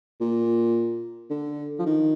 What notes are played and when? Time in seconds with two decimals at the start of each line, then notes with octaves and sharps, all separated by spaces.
0.21 A#2
1.30 D3
1.79 F3
1.86 D#3